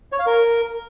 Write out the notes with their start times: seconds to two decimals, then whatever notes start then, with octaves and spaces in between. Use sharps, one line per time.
0.12 C#5
0.19 F5
0.26 A#4